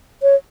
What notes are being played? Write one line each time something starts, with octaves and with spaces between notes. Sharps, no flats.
C#5